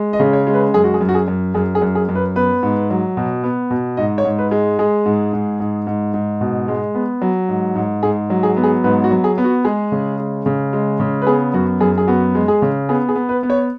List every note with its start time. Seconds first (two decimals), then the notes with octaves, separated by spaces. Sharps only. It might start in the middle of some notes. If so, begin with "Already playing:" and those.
Already playing: G#3
0.13 D#5
0.20 C#3
0.33 C#5
0.47 G#3
0.54 B4
0.74 F#2 G#4
0.84 F#4
0.94 G#4
1.01 F#2
1.09 F#4
1.15 G#4
1.28 F#2
1.54 F#2 G#4
1.75 G#4
1.82 F#2
1.95 G#4
2.09 F#2
2.15 B4
2.36 B3 B4
2.63 G#2
2.90 F#3
3.17 B2
3.44 B3
3.70 B2
3.97 G#2 D#5
4.18 C#5
4.24 G#2
4.39 B4
4.51 G#3
4.79 G#3 G#4
5.06 G#2
5.33 G#2
5.60 G#2
5.87 G#2
6.14 G#2
6.41 B2
6.68 G#3
6.95 B3
7.21 F#3
7.49 G#2
7.75 G#2
8.03 G#2 G#4
8.30 F#3
8.43 G#4
8.57 B3
8.64 G#4
8.84 G#2 B4
9.04 F#4
9.11 F#3
9.24 G#4
9.38 B3
9.44 F#4
9.65 G#3 G#4
9.92 C#3
10.19 G#3
10.46 C#3
10.73 G#3
11.00 C#3
11.22 B4
11.27 B3 G#4
11.54 F#2 F#4
11.80 F#2 G#4
11.98 G#4
12.07 B3 F#4
12.35 G#3
12.48 G#4
12.62 C#3
12.89 B3 G#4
13.09 G#4
13.16 B3
13.29 B4
13.43 B3
13.50 C#5